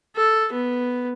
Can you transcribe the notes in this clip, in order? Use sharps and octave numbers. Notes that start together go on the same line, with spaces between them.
A4
B3